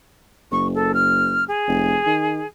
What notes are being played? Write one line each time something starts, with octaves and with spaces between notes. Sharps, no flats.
F#1 C#6
A4
F6
G#4
F1
D#3